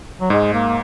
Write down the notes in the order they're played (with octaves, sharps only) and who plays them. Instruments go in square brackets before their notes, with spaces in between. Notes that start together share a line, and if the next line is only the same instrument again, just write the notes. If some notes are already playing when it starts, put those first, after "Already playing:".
[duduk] F#3
[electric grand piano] G#2 [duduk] G#3
[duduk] A#3